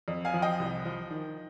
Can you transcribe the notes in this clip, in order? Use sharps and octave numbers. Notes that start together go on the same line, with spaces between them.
F2
F5 G#5
F3
D#5 G5
C2
F3
D#3